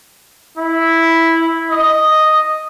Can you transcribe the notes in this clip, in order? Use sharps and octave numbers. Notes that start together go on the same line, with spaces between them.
E4
D#5